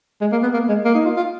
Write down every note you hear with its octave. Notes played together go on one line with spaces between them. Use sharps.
G#3
A#3
B3
A#3
G#3
A#3
D#4
F4
F4